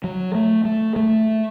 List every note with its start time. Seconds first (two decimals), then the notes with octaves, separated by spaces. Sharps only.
0.04 F#3
0.35 A3
0.65 A3
0.96 A3